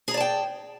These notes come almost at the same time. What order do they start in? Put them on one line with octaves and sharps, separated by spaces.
G#4 A#5 D5 A5 G5